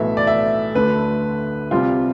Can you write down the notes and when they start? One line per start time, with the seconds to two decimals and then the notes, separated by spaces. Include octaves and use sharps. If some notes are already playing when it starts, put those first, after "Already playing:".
Already playing: B1 A2 E3 A3 E5
0.17 D5
0.27 E5
0.75 D2 D3 A3 B4
1.71 C2 C3 G3 C4 F4